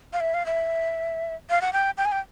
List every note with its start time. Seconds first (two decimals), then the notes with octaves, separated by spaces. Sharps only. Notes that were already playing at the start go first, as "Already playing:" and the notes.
0.13 F5
0.20 E5
0.34 F5
0.46 E5
1.50 F5
1.61 F#5
1.73 G5
1.98 G5
2.05 G#5
2.12 G5